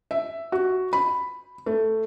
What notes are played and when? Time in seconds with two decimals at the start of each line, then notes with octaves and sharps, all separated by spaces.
0.11 E5
0.52 F#4
0.93 B5
1.66 A3